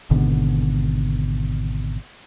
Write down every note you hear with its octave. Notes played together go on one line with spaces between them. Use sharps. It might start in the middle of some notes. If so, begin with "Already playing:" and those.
G#1 B2 D3